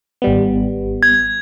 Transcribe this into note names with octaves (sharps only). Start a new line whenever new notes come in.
G#1 G3 B3
G#6